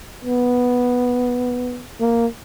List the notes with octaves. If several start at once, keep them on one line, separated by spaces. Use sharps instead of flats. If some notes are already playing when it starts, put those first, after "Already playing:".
B3
A#3